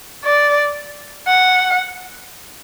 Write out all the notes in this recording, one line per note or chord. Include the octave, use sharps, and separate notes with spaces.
D5
F#5